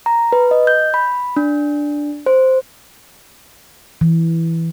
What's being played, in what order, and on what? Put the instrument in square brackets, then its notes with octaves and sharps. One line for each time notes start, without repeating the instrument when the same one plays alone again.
[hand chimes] A#5
B4
D#5
G6
B5
D4
C5
[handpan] E3